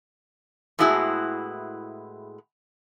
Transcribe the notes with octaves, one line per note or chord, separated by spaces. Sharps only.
A2 G#3 B3 E4 F#4 G#4